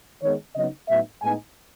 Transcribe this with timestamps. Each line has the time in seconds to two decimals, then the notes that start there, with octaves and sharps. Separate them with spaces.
0.22 D#3 G#3 B3 C#5
0.55 C#3 F#3 B3 D#4 D#5
0.89 A2 F#3 B3 D#4 E5
1.22 A2 G#3 B3 D#4 G#5